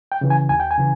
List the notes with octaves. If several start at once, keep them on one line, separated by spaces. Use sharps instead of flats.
G5
C#3 E3
G#5
D#2 G#5
G5
G#5
C#3 E3